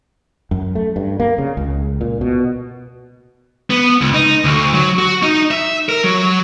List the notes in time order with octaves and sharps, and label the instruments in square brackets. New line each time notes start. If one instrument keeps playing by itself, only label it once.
[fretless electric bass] F#2
A3
G2
A#3
C#3
C#2
A#2
B2
[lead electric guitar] B3
C#2
D#4
D2
F#3
F#4
D#4
E5
A#4
F#3